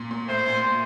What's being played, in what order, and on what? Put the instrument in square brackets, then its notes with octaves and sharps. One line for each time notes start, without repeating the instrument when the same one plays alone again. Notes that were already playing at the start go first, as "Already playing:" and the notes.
Already playing: [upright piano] A#2
A#2
[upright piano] A2 [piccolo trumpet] C5
[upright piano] A#2
A#2